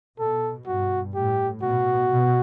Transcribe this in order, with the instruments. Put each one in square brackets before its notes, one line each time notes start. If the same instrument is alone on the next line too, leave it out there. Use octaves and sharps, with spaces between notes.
[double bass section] B2 [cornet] A4
[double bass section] G2 [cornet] F#4
[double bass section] A2 [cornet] G4
[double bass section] B2 [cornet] F#4
[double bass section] B2